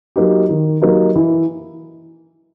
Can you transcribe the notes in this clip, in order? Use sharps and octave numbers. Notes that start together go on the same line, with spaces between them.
F#3 A#3 D#4 G4
D#3
F#3 A#3 D#4 G4
E3